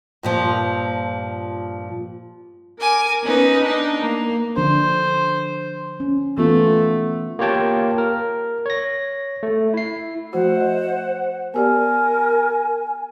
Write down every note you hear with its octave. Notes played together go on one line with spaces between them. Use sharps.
G2 A#2 F3
A#4 G#5 D6
B3 C#4 D#4 B4
D4 D#4
A#3
D3 F3 D4 C5
C#4
E3 A3 B3 F4
A#3 F4 G4 C#5 G5 A5
A#4
C#5 A#6
A3
E4 C7
F3 A3 F#4 C5 F#5
D#5 E5
B3 G4 A#4 D5 G#5